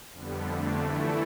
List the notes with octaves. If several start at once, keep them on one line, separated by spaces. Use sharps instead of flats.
F2 D3 G3 B3
F2 D3 A3 D4
E3 A3 E4